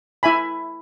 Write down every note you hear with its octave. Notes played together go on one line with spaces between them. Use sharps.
E4 E5 G#5 B5